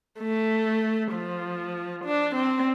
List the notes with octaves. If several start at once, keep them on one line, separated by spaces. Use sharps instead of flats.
A3
F3
D4
C4